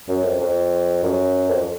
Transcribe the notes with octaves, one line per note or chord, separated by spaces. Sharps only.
F#2
F2
F2
F#2
F2